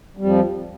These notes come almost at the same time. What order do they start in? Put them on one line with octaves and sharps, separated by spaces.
G3 F2 F3